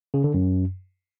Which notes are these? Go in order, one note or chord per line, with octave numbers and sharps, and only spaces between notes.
C#3
D3
F#2